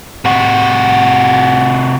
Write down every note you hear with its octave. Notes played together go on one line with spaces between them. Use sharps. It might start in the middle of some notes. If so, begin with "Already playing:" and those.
C3 F#4